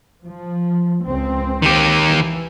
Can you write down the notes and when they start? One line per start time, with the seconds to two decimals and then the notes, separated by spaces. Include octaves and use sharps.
0.24 F3
1.04 C#2 C4
1.62 D#3 G4
2.08 E3